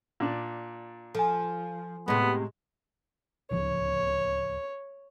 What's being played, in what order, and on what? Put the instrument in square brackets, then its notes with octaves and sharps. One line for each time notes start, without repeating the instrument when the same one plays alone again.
[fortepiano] A#2 D4
[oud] F3 [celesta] A4 G#5
[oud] A2 C3 [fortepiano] G#3 [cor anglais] B3
[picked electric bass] D1 C#2 F3 [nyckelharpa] C#5